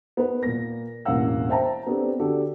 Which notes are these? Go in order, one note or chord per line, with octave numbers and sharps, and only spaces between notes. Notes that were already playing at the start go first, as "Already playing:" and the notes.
B3 D#4 B4
A#2 A#3 A#6
E1 A1 A#3 F5 F#5 E6
C5 E5 G5 A5 A#5
B3 C4 D4 G4 A4
D3 D4 F#4 G4 A4